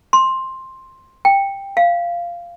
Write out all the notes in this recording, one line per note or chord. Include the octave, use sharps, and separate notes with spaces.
C6
G5
F5